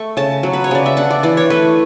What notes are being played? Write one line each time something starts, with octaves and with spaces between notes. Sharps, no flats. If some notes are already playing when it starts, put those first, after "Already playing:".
Already playing: A3 C#6
C#3 A5
F#3
B4
C#5
C#3 D5
E5
D4 F#5
D5
E3 D5
C#5
A3 B4